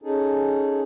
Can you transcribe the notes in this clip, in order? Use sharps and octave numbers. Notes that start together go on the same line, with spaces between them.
C#4 D#4 G#4 A4